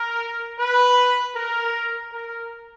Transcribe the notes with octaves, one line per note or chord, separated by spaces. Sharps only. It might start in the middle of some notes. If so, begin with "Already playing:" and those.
Already playing: A#4
B4
A#4
A#4